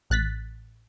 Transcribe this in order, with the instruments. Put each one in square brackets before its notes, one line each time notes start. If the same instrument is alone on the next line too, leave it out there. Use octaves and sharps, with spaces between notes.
[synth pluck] A1 F#6 A6 B6